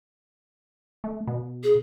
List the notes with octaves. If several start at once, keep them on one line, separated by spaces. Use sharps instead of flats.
A3
B2
G#4